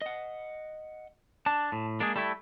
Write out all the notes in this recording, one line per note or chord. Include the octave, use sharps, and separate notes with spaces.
D#5 F#5
D4 A5
A2
G#3 A#3 D4 G#4
G3 A3 E4 A4